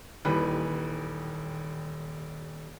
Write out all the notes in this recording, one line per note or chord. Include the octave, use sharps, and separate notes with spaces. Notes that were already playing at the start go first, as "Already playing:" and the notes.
D#1 D#2 E3 B4 B5